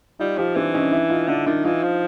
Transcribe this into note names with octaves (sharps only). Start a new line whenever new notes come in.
G3 D#4 F4
F3 F4 G4
E3 C4 D4
C#4 D#4
D4 E4
D#4 F4
D3 D4 E4
D#3 D4 E4
E3 D#4 F4
F3